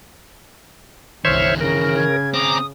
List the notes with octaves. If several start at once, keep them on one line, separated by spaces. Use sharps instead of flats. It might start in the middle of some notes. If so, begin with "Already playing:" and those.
G1 C2 D#3 E3 C5 C#5 E5 F6
C#3 A#4 A#6
G#6
C4 G#4 A#5 D6 D#6